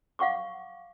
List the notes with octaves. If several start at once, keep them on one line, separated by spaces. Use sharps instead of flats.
F5 F#5 C#6 D6